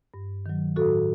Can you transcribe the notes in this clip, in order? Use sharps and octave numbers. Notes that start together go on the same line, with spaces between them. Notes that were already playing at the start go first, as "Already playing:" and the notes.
G2
D#3 F#3
A2 F#4 A4